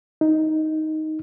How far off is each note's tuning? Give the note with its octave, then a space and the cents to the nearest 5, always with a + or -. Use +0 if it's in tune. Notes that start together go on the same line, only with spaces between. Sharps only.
D#4 +5